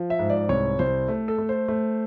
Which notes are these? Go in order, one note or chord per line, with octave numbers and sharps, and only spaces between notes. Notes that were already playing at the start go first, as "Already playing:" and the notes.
Already playing: F3
E5
G#2
D5
C2 C#5
C2 C5
A3
A4
A3
C5
A3